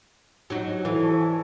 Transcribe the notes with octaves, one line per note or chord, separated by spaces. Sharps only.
F#3 D#4 F#4
E3 E4 A4
D5 A5 C#6
G#5